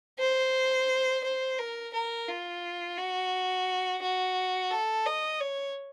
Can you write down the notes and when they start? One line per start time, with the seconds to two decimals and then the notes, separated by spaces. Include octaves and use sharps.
0.19 C5
1.24 C5
1.59 A#4
1.93 A#4
2.28 F4
2.98 F#4
4.02 F#4
4.71 A4
5.06 D#5
5.40 C#5